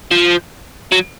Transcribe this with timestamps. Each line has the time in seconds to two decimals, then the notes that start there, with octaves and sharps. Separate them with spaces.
0.11 F3
0.92 F#3